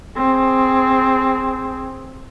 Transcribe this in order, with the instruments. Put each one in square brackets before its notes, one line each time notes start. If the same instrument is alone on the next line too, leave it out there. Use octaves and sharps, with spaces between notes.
[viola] C4 G#4